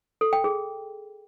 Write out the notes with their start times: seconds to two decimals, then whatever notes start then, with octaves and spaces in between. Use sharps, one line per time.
0.21 A4
0.33 G5
0.44 G#4